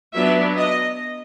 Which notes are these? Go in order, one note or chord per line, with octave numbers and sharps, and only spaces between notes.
F#3 B3 D4 E5
D#5